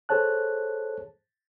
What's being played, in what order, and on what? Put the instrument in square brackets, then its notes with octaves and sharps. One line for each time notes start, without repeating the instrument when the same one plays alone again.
[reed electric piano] G#4 A4 C5 C#5 A5 F#6